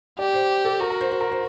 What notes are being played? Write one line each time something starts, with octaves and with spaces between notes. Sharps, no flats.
G4 D5
C5
A4
F#4 A#4
A#4
C5
C5
A#4
C5